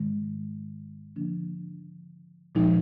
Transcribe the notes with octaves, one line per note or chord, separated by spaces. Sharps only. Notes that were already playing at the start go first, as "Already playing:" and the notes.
Already playing: G#2 D#3 G#3
D3 F3 A#3 D4
A#2 F3 G#3 D#4